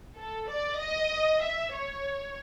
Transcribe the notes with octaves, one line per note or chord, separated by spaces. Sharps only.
A4
D5
D#5
E5
C#5